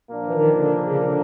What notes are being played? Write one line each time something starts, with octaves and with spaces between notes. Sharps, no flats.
A#2 F3 A#3 D4
E3
D#3
D3
C#3
D#3
D3